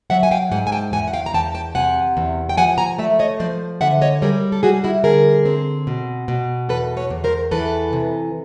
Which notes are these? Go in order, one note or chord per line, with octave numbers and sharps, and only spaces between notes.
F#3 E5 F#5
G#5
F5 G5
G#2 F#5 G#5
G#5
G5 A5
E2 F#5 G#5
F#5
F5 G5
A#5
E2 G5 A5
G5 A5
C3 F#5 G#5
E2
G5
F3 F#5 G#5
G#5 A#5
A3 D5 E5
C#5 D#5
F3 C5 D5
D3 E5 F#5
C#5 D#5
G3 G#4 A#4
A4
G3 F#4 G#4
E4 F#4
D3 G#4 A#4
C4
B2
B2
E2 A4 B4
B4 C#5
E2
A#4 C5
E3 A4 B4
C3